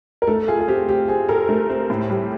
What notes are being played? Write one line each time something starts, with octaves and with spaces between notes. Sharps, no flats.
A#4
A3 A4
F4 G#4
G#4
C4 G4
C4 G4
C4 G#4
A4 A#4
A3
C4
A2
G3